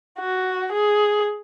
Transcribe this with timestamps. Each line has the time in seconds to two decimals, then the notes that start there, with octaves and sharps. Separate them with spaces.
0.19 F#4
0.73 G#4